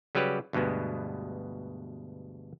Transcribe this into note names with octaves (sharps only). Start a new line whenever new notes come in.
C#3 F#3 G3 G4 B4
D2 G2 B2 G#3 B3